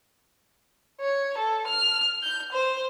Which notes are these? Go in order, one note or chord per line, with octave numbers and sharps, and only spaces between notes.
C#5
A4
F6
G6
C5